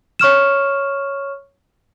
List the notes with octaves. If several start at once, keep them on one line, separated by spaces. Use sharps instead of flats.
C#5 C#6 F6 E7